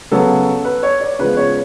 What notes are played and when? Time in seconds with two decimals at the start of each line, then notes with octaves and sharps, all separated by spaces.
0.11 C#3 F#3 B3 A4
0.65 B4
0.83 C#5
1.01 D5
1.19 C#3 F3 G#3 B3 B4
1.37 C#5